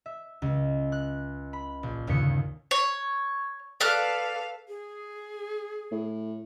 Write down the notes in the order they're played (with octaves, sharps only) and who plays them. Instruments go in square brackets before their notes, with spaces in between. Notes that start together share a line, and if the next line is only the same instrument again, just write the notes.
[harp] E5
C#2
F#6
B5
A#1
G1 D#2 C#3 B6 C#7
[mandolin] C#5
[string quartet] A4 B4 F5 [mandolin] D5 F6 F#6
[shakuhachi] G#4
[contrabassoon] A2